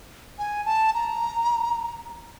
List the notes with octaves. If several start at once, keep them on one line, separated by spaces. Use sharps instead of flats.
G#5
A5
A#5